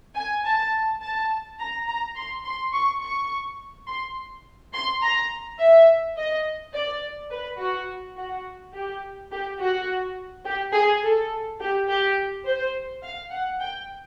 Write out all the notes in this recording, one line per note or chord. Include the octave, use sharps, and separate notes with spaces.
G#5
A5
A5
A#5
A#5
C6
C6
C#6
C#6
C6
C6
A#5
E5
D#5
D5
B4
F#4
F#4
G4
G4
F#4
G4
G#4
A4
G4
G4
C5
F5
F#5
G5